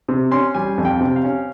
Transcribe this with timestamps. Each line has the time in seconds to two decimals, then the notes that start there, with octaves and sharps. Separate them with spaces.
0.08 C3
0.31 C#4 C6
0.55 G3 G#5
0.78 F2
0.85 G5
1.01 C3
1.16 F5
1.24 C#4